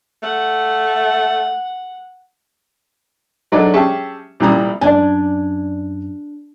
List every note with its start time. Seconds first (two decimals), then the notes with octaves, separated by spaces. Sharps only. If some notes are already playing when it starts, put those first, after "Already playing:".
0.23 A3 F#5
3.52 G#2 F#3 A3 D4 D5 D#5
3.74 C#4 G4 G#4 E5 A5 C#6
4.40 C2 A#2 E3 G3 A#5 D#6
4.81 F#2 D4 D5 G#5